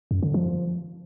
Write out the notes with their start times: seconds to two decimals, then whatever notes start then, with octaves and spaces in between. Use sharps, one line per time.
0.11 F#2
0.23 D3
0.34 F3